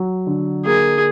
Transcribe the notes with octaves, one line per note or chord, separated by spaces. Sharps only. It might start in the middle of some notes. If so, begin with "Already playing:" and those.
Already playing: F#3
D3
A#3 G#4